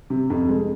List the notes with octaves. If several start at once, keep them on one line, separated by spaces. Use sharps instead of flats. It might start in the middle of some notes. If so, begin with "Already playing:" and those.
C3
F2
G#3